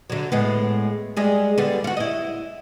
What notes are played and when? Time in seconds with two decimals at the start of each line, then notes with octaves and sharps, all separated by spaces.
0.10 D3 F#3
0.32 A2 G#3 B3
1.17 G3 G#3 G#4
1.58 D3 G3 B3
1.84 F4 F#4
1.97 E4 D#5